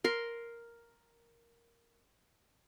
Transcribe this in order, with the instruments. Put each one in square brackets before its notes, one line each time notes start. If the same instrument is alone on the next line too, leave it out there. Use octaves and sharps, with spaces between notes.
[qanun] A#4 C6